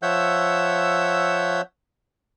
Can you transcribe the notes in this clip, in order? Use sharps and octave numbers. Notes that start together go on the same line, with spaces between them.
F3 C#5 E5 F#5 E6 G6